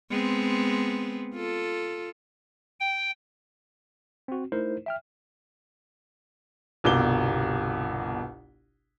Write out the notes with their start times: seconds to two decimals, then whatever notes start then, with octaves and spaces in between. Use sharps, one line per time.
0.10 G#3 B3 C4
1.34 F4 A4
2.80 G5
4.28 C4 F#4
4.52 A3 D#4 E4 A#4 C5
4.86 E5 G5 F6
6.84 G1 C2 B2 D6 G7